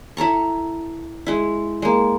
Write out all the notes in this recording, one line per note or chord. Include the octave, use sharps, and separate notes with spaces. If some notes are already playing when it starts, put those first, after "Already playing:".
E4 A4 A#5 C#6
G#3 E4
G#3 A#3